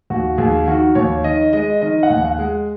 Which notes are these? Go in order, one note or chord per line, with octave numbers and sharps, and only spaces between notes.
D#2 F#4
D#2 G#4
D#3 F#4
D#2 C#5
D#3 D#5
G#3 D#5
D#3 D#5
F#5
D#2
F#5
G#3